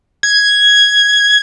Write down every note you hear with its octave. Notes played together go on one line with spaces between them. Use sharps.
G#6